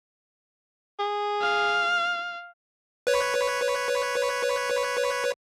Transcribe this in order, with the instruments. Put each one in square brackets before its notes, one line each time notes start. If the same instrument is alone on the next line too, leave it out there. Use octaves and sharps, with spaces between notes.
[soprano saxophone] G#4
[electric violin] F5
[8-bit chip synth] B4 C#5